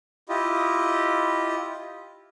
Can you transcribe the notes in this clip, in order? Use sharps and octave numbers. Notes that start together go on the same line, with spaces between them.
E4 F4 G4 D#5